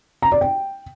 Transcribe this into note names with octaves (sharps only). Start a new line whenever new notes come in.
A#5
D5
G5